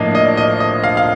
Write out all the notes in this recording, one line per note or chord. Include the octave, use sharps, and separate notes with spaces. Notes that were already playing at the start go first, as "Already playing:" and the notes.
Already playing: A2 F3 A#3 D4 D#5 F5
D#5
D#5
D#5
F5
F5